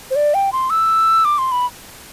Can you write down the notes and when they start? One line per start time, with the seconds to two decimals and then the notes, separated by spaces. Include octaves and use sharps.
0.11 C5
0.16 D5
0.34 G5
0.52 C6
0.70 E6
1.25 D6
1.38 C6
1.52 B5